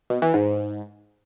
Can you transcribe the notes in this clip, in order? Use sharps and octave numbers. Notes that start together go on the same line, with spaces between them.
B2
E3
G#2